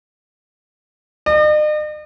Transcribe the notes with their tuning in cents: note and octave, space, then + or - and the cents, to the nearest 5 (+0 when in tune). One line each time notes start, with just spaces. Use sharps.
D#5 -45